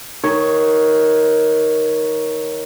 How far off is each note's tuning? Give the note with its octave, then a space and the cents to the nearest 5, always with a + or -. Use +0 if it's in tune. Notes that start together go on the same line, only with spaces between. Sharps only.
D#3 +10 C#5 +0